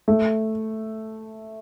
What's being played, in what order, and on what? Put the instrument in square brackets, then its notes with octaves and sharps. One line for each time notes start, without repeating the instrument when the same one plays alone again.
[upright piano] A3